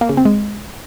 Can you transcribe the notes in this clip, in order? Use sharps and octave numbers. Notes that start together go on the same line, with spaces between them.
A#3
C#3
C4
G#3